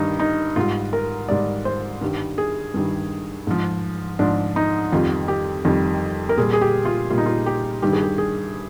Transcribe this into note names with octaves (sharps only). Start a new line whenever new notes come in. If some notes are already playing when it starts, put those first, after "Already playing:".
Already playing: G2 D#3 G3 D#4
D#4
G#2 G3 F4
A#4
G#2 G3 D5
C5
G2 D#3 G3
G#4
G2 D#3 G3
G#2 F3
G#2 F3 D4
D#4
F2 D#3 G3 F4
G4
F2 D#3 G3
A#4
A#2 G3 G#4
G#4
G4
F4
A#2 G3 F4
D#4
F4
G4
G2 D#3 G3 G4
G#4
G4
G#4